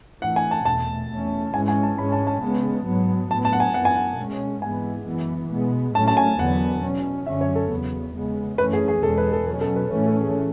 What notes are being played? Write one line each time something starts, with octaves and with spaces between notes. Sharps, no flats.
A2 E3 A3 F#5
G#5
A5
E2 B2 A3 A5
E2 B2 A3 C#4
G#2 E3 G#3 C#4 G#5
G#5
A5
G#2 G#3 C#4 B5
A5
A5
C#3 G#3 B3
G#2 F#3 B3
A2 F#3 B3 A5
A5
F#5
G#5
F#2 E3 B3 F#5
G#5
F#5
B2 G#3 C#4
G#2 E3 G#3 B3 G#5
F#2 E3 B3
B2 G#3 B3
A2 F#3 A3 C#4 A5
A5
G#5
E2 D3 F#3 B3 F#5
B2 F#3 C#4
F#2 D3 F#3 C#4 E5
C#5
A4
E2 C#3 F#3 B3
C#3 G#3 B3
F#2 E3 A3 C#4 B4
G#4
G#4
E2 B2 G#3 A4
B4
A4
B2 F#3 C#4 A4
A4
B4
A2 E3 A3 C#4 B4
A4
G#4